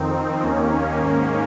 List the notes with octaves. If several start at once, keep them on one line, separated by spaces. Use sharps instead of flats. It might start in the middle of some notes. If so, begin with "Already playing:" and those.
Already playing: F2 D#3 C4 D#4
D#2 D#3 A#3 C#4
G#2 D#3 A#3 C#4